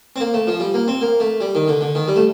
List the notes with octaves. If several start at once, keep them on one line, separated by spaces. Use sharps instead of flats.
C4
A#3
A3
F3
G3
A#3
C4
A#3
A3
G3
D#3
D3
D3
D#3
G3
A3